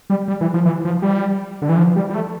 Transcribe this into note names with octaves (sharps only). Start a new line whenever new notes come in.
G3
G3
E3
F3
E3
F3
G3
D3
E3
F3
G3
G3
A3